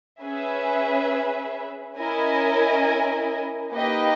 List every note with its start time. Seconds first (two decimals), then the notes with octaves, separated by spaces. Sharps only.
0.23 C#4 G#4 B4 E5
1.97 C#4 E4 A#4 D#5 G#5
3.73 A#3 D#4 G4 B4 D#5